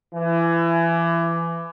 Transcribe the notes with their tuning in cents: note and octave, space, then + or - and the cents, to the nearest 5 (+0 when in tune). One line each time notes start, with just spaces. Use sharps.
E3 +25